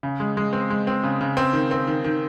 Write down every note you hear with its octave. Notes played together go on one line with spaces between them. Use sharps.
C#3
G#3
G#3
C4
G#3
C4
C#3
C#3
C4
D#3
C4
D#3
D#3